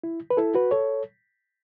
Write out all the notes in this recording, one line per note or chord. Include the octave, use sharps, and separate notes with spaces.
E4
B4
E4 A4
F#4 B4
A4 C#5